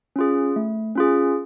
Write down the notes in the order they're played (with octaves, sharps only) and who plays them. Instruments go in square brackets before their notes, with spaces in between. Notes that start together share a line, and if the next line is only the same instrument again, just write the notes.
[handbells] C#4 F4 G#4
A3
C#4 F4 G#4